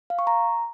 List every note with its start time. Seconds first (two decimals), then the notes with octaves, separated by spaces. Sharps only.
0.10 F5
0.19 C#6
0.27 A#5